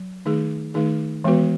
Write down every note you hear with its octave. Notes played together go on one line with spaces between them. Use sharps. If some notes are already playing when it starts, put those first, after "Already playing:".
Already playing: F#3
D#3 A3 D#4 G#4
D#3 A3 D#4 G#4
E3 G#3 B3 F#4 B4